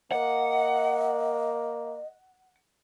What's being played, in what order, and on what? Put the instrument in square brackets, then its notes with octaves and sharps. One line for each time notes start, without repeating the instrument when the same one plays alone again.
[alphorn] A#3 [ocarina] D#5 [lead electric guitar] F#5